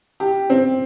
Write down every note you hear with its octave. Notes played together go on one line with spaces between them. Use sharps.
G4
C4